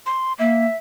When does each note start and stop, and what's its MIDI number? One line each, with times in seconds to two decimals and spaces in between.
0.06 0.33 84
0.39 0.65 58
0.39 0.77 76